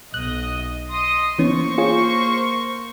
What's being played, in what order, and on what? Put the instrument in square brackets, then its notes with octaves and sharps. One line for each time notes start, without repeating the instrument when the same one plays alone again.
[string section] B1 D#5 [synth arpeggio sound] F#6
[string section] D#5 C6 D#6
[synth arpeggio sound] E3 B3 C#4 [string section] A#3 C5 C#6
[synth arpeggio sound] F4 G#4 C#5